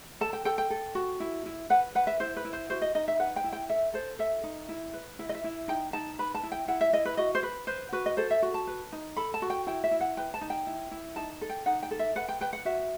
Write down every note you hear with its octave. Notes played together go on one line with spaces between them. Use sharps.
A4 A5
G5
A4 G5
G5
A4
F#4
E4
E4
B4 F#5
B4 F#5
E5
E4 C5
B4
E4
C5
F#4 C5
D#5
D#4 D#5
E5
B4 F#5
G5
E4
G5
A4 E5
A4 C5
A4 E5
D#4
E4
B4
E4 E5
D#5
E5
E4
D#4 G5
D#4 A5
B4 B5
A5
E4
G5
E4 F#5
E5
E4 D#5
B4
F#4 D#5
C5
B4
B4 C5
F#4 B4
D#5
A4 C5
E5
F#4
A5
B4
D#4
A4 B5
A5
F#4
G5
E4 G5
E5
E4
F#5
B4 G5
A5
D#4
G5
E4
E4
D#4 A5
A4
G5
D#4 F#5
G5
A4
E5
B4 F#5
G5
B4 G5
F#5
F#4 E5